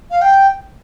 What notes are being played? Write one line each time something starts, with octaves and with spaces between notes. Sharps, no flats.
F5
G5